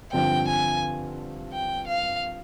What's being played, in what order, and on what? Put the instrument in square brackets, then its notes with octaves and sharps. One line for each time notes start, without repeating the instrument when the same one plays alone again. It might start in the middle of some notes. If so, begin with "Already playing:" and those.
[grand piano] G2 D3 F3 C4 [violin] G5
[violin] G#5
G5
F5